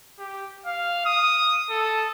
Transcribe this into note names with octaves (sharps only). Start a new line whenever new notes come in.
G4
F5
D#6
A4